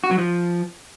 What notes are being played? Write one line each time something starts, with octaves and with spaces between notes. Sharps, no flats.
F#4
F#3
F3